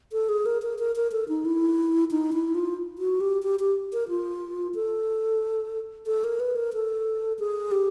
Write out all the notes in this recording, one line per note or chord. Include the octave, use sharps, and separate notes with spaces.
A4
G#4
A#4
A#4
A#4
A#4
A4
D#4
E4
D#4
E4
F4
F#4
G4
G4
G4
A#4
F4
A4
A4
A#4
B4
A#4
A4
G#4
G4